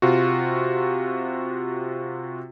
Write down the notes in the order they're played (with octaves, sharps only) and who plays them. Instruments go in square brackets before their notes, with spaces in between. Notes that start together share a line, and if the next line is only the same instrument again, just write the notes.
[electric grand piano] C3 F4 F#4